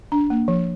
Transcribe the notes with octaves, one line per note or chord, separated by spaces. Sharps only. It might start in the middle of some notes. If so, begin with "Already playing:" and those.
D4
A#3
F3